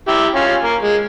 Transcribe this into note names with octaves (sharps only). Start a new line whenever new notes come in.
E4 G4
C#4 F4
A#3
G#3